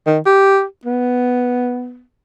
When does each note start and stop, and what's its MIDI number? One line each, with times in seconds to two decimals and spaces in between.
0.07 0.19 51
0.26 0.63 67
0.85 2.02 59